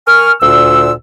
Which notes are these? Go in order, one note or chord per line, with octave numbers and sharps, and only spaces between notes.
A#4 G#5 C#6 F6
D2 A#2 E6